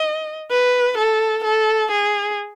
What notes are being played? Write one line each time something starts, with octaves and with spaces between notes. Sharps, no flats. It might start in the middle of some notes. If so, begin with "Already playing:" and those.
Already playing: D#5
B4
A4
A4
G#4